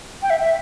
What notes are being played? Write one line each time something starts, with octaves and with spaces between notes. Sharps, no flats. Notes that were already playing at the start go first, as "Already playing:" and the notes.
G5
E5
E5